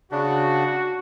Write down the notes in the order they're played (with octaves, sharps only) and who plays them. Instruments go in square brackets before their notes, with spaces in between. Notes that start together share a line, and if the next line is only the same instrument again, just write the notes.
[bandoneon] C#3 D4 [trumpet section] F#4